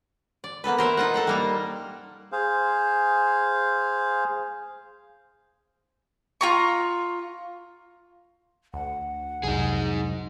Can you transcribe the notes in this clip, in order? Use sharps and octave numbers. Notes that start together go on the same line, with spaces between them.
D5
A#3 B3 A4 B4
A#4 C5 E5
D#4 F4 F#5
A4 F#5 G5
G3 A#3 F5
G#4 C5 F5
F4 A#5 C#6
D2 F#5
C2 F2 C3 F#3 D#4 G#4